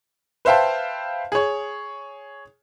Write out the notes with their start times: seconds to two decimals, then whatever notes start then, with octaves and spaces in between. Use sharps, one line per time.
0.45 B4 C5 E5 F5 G5 A5
1.32 G#4 C#5